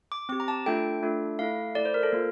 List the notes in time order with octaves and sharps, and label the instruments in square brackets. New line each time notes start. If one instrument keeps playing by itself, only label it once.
[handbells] D6
C4 D6
G4
A#5
A5
A3 D4 F4 A4 G5
A3 D4 F4 A4
A3 E4 A4 F5
A3 E4 A4 D5
C5
A#4
A4
A#3 F4